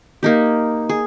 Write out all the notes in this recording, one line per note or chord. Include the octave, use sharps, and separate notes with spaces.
A#3 D#4 G4
G#4